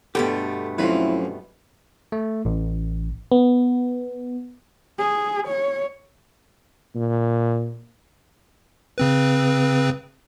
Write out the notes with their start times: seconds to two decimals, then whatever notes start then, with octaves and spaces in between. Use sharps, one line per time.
0.15 G2 B2 D3 A3 B3 G4 G5
0.78 D2 F3 F#3 C4 C#4 E4 B4
2.12 A3
2.45 A1
3.32 B3
4.98 G#4
5.48 C#5
6.95 A#2
8.98 C#3 C4 B4